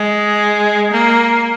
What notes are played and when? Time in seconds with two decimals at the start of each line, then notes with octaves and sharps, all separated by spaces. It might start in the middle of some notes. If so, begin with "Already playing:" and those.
Already playing: G#3
0.92 A#3